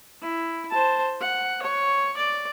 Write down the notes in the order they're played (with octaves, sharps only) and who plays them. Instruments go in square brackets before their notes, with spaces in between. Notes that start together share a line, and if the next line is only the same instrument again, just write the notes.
[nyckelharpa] E4
C5 A5
F#5
C#5
D5